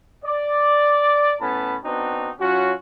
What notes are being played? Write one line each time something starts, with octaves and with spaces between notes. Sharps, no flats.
D5
A2 B3 C#4 A5 B5
B3 C4 D4 D#4 F#4
F#3 C#4 F4 F#4